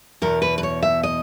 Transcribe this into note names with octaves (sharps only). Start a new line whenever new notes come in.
E2 B2 A#4
B4
B4
C#5
E5
D#5